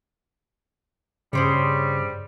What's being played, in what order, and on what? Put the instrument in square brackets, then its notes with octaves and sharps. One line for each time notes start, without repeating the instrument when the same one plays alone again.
[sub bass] G2 [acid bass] C#3 [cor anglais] G3 [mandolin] G#4 C5 C#5